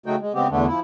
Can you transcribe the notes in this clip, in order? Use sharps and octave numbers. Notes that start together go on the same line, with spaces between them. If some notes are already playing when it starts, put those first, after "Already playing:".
C#3 F#3 A3 D#4 F#4 G5
G#3
C#3 G#3 B3 C4 G4
E2 D3 A3 B3 D4
F3 E4